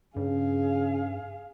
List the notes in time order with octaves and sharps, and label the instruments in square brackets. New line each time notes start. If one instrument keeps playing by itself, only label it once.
[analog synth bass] G2 [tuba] C#3 [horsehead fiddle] G#4 F5